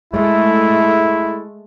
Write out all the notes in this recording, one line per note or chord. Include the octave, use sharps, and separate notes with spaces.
G#3 A3 E4